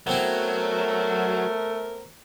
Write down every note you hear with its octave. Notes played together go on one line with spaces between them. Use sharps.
F#3 A3 B3 C4 E4 A#4